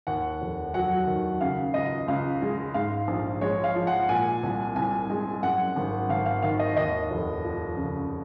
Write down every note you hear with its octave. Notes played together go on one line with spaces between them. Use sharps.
D#2 F#5
F1
F#3 F#5
D#3
C#3 F5
C#2 D#5
C#2 F5
G#3
G#2 F5
A#1
G#3 C#5
F5
F3
F#5
A#2 G#5
C2
C2 G#5
G#3
F#2 F#5
G#1
G#1 F5
F5
D#3 F5
D#5
D#2 D#5
F1
F3
C#3